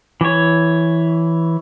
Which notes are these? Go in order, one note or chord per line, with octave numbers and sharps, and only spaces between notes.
E3 C#5